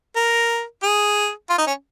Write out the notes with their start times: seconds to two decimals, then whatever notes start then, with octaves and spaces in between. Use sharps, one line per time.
0.16 A#4
0.83 G#4
1.49 F4
1.58 D#4
1.67 C#4